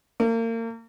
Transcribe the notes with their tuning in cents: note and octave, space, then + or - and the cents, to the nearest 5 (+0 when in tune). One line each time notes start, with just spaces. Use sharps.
A#3 -35